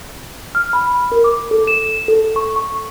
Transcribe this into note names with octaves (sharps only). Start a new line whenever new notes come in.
F6
B5
A#4
D6
A4
E7
A4
C#6
C#6